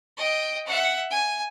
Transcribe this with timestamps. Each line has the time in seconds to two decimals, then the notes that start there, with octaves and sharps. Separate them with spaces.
0.17 D#5 G5
0.66 E5 F#5
1.10 G#5